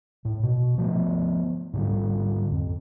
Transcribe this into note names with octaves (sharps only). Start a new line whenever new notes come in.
A2
B2
F3 A3 B3
G#2 D3 G3
F2